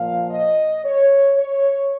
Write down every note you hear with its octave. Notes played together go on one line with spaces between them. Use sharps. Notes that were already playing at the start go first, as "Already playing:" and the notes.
Already playing: A#2 F3 F5
D#5
C#5
C#5